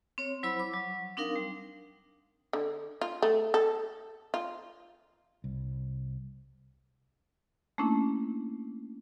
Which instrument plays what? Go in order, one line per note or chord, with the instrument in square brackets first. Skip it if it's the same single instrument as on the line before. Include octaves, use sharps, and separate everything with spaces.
[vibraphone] C4 C#5
F#3 E4 C5 B5 E6
D6
F#3
C4 D4 D#4 A#4 F5
G3
[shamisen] D3
F4
A3
A4
F4
[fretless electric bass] C2
[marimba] A3 A#3 C#4 D4 E4